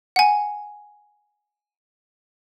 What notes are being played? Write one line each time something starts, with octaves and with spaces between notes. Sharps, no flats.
F#5 G#5